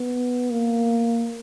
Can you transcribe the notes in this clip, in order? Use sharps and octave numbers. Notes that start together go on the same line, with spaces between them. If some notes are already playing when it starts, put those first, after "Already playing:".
Already playing: B3
A#3